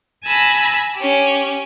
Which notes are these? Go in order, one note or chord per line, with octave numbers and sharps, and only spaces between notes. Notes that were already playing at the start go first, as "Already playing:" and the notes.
G#5 A5 B5 E6 A#6
C#4 G4